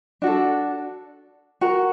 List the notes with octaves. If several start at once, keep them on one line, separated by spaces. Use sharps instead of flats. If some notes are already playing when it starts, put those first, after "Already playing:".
D4 F#4 A4
F#4 A#4